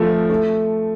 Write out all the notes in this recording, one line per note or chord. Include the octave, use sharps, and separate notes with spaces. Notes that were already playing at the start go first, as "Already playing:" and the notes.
Already playing: F3 A3
A3